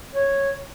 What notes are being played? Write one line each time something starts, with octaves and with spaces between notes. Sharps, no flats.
C#5